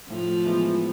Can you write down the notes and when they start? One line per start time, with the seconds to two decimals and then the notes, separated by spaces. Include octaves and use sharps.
0.10 A2 F3
0.45 E3 G#3 B3